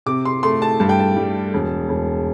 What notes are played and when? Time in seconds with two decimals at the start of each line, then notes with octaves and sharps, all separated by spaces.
0.06 C3 D6
0.25 C6
0.43 A3 C6
0.62 A5
0.80 G2 A5
0.89 G5
0.99 A5
1.16 G3
1.54 E1
1.89 E1